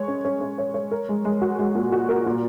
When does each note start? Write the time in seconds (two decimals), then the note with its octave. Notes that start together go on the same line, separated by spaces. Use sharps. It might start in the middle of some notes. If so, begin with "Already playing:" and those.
Already playing: G#3 C#5
0.08 C#4
0.25 C#4
0.41 C#4
0.58 C#5
0.74 C#5
0.91 A#4
1.09 G#3
1.25 G#3
1.42 F#4
1.59 G#3
1.75 A#2
1.92 F#4
2.09 A#4
2.26 A#2